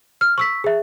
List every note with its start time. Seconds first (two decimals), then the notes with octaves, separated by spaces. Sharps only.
0.21 F6
0.38 C#6 E6 B6
0.64 G#4 E5